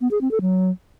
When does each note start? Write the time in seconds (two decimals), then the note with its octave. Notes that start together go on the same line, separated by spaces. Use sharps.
0.01 B3
0.11 G#4
0.21 C4
0.31 A4
0.41 F#3